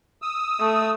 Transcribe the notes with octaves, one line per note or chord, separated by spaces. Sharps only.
D#6 E6
A3